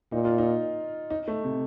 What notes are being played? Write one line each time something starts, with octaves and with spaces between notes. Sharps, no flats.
A#2 D#4
F4
D#4
D#4
A3
C3